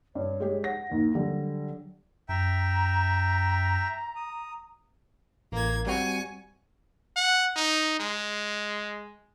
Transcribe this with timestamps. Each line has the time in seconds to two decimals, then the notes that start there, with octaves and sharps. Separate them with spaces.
0.15 G2 C#5
0.40 G#3 G4
0.64 F#5 A#6
0.91 D#2 D#4
1.15 D3 F#3 G3
2.29 F#2 E5 G5 A#5
4.16 D#6
5.52 A1 A#3 G#6
5.87 G3 C4 F#4 G#5 C#7
7.16 F#5
7.56 D#4
8.00 G#3